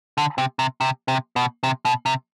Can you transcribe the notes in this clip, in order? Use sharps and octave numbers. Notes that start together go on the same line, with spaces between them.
D3
C3
C3
C3
C3
B2
C3
B2
C3